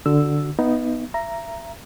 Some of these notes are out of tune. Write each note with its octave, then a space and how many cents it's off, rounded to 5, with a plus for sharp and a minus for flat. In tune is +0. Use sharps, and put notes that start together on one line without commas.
D3 +0 F#4 +0 E6 +0
B3 +0 D#4 +0 E5 +40
E5 +30 A#5 +0